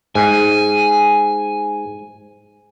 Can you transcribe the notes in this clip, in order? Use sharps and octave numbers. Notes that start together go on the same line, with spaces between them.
G#2 G#5